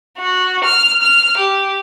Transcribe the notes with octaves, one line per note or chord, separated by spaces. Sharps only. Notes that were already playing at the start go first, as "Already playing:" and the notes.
F#4
F6
F6
G4